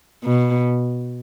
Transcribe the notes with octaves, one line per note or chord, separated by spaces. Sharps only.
B2